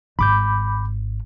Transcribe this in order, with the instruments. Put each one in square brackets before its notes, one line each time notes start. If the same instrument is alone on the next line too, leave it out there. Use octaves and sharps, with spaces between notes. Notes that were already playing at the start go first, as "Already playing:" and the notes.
[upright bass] G#1 [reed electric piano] B5 D6 G6